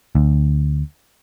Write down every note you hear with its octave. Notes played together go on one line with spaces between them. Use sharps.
D2